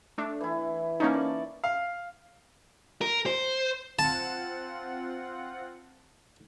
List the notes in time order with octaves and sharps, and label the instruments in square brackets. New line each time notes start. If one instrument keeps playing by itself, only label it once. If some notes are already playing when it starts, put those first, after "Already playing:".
[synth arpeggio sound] A3 D4
[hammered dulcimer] E3 E4
[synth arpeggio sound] A#3 C#4 D#4 [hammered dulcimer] A5 C#6
[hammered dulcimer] D5
[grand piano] F5
[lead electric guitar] A#4
C5
[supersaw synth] C4 F4 F#5 [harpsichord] A5